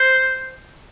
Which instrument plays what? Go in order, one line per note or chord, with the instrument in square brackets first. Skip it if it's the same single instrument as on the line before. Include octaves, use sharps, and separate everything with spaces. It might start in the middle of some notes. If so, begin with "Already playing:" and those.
Already playing: [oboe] C5